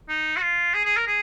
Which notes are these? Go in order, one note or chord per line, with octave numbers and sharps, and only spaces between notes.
D#4
F#4
F4
G#4
G#4
A#4
G#4